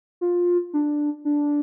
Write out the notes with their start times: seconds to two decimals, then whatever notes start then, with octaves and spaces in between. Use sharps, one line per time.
0.21 F4
0.73 D4
1.25 D4